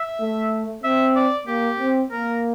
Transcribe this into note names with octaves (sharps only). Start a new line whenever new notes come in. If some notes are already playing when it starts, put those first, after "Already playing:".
Already playing: E5
A3
C4 E5
D5
A#3 G4
C4
A#3 A#4